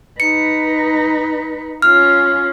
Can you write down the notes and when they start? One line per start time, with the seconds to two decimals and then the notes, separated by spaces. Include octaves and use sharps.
0.20 D#4 B4 C#7
1.82 C#4 F4 F6